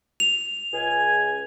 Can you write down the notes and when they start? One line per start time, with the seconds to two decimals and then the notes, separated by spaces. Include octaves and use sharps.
0.20 F7
0.73 C#2 G#5